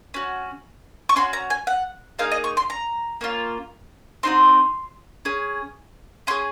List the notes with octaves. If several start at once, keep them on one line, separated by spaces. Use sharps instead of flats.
C#4 F#4
C#6
C#4 F#4 C6
A#5
G#5
F#5
A#3 D#4 G#4 F5
D#5
C#6
C6
A#5
A#3 C#4 F4
C4 D#4 F#4 C6
C#4 G#4
C#4 G#4 C6